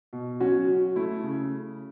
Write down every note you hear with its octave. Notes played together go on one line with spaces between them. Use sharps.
B2
F#3 C#4 F#4
F#3
A3 E4
C#3